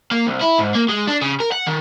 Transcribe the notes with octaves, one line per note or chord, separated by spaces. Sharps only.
A#3
C2
E4
G#2
A#3
G#3
D4
C#3
A#4
F#5
D#3